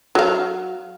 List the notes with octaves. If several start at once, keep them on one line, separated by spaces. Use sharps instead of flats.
F#3 F5